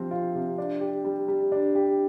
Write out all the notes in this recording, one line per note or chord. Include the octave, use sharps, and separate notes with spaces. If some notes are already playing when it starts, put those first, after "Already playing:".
Already playing: C3 F3 C4
F4
C3
D4
G4
G3
G3
D4
G4